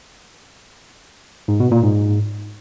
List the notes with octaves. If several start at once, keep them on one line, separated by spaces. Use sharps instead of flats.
G#2
B2
A#2
G#2